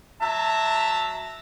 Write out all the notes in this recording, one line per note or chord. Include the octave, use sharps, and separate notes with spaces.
F#3 E5 A5 A#5